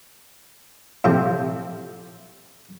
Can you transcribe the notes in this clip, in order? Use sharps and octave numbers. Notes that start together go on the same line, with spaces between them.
A2 C3 F3 C4